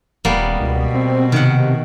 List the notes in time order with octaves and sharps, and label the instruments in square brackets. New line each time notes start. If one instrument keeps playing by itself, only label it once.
[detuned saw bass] D#1 [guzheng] G3 A#3 B3
[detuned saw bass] C#2 [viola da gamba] B2
[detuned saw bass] C4
[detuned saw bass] C3 [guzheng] D#3 F#5